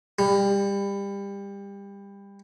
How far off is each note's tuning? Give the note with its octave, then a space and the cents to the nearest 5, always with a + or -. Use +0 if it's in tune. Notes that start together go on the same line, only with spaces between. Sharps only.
G3 +25